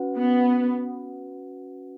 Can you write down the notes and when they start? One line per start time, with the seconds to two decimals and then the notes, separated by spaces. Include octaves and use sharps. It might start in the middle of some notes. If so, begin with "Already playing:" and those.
Already playing: C#4 F#4 B4 F#5
0.17 B3